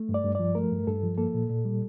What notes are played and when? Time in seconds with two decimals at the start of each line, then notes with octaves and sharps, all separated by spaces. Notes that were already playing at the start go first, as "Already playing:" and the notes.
Already playing: A3
0.09 G2
0.14 D5
0.25 G2
0.35 F3 D5
0.55 A3 A#4
0.72 G2
0.87 G2 A4
1.03 F3
1.18 A#3 A4
1.34 A#2
1.50 A#2
1.65 G3